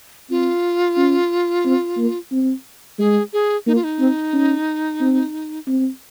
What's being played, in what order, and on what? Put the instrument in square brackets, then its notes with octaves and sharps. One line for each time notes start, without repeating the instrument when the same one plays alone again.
[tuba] C4 [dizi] F4
[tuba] C#4
C4
A#3
C4
[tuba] G#3 [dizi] G#4
[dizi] G#4
[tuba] A#3 [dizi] D#4
[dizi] F4
D#4
[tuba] C4
C#4
C4
C4